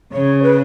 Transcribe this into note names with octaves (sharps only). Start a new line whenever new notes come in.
C#3 C#5
B4